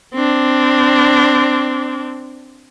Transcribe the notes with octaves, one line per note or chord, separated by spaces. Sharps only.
C4 D4